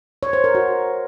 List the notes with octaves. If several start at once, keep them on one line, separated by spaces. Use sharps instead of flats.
C#5
C5
A#4
F#4